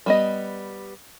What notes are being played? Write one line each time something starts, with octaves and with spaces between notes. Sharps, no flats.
G3 B3 D#5